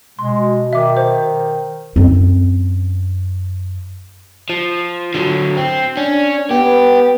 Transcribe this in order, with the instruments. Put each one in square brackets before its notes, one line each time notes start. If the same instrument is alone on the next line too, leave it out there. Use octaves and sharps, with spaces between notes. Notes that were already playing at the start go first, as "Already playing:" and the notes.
[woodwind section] B2 [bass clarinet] G#3 [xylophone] C6
[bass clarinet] D#3 [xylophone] E5 D6
[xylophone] C5
[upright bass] F#2 C4
[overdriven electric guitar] F3
D3 F#3
C4
[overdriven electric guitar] C#4 [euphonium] D4
[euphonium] B3 [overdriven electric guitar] G4